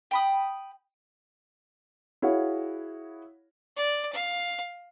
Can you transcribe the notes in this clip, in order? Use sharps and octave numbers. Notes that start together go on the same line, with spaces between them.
G5 B5 D#6
E4 F#4 G#4 C#5 F5
D5
F5